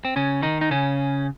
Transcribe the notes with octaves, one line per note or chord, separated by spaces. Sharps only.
C4
C#3 C#4
D#3 D#4
D#4
C#3 C#4